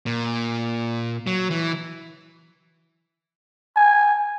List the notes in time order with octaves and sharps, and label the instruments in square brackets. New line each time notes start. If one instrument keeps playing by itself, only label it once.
[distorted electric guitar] A#2
F#3
E3
[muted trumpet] G#5